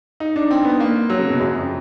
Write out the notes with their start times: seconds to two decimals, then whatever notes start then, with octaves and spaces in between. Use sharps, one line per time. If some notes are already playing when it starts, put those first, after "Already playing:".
0.20 D#4
0.36 D4
0.51 C4
0.65 B3
0.80 A#3
1.10 F#3
1.19 C#3
1.30 B2
1.40 F#2
1.55 F2